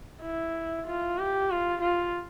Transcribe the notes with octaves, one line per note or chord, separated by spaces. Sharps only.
E4
F4
G4
F4
F4